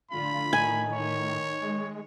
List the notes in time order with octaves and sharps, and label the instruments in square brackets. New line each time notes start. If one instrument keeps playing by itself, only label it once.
[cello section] A2 D3 F4 [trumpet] B5
[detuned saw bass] A2 [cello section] D#3 A3 D#4 [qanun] G#5
[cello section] D#3 [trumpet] C#5
[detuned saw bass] G#3